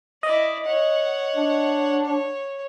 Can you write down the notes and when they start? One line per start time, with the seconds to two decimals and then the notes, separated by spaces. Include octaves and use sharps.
0.23 E4 D5 D#5
0.65 C#5 F#5
1.36 D4
2.05 C#5